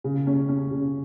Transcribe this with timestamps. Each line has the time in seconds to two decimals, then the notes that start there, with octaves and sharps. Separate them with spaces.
0.04 C#3
0.27 C#4
0.49 C#4
0.71 C#3